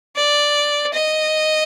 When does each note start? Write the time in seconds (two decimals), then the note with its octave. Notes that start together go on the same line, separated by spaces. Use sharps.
0.16 D5
0.94 D#5